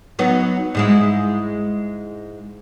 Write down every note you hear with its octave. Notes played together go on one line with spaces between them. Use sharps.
F#3 B3 D#4
G#2 G#3 E4